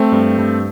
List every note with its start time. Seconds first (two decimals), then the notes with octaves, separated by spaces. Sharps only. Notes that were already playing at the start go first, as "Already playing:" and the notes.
Already playing: A3 C4
0.12 G2
0.38 G2